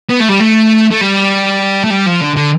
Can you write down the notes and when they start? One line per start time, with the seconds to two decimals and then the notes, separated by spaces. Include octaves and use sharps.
0.10 B3
0.21 A3
0.29 G3
0.40 A3
0.91 A3
1.01 G3
1.84 A3
1.90 G3
2.06 F3
2.20 D3
2.36 D3